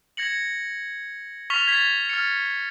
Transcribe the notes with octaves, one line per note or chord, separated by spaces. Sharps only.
G#6 A#6 C#7 F#7
C#6 F6 A6 B6 F7 G7
G#6 A6 B6
F6 A6 C#7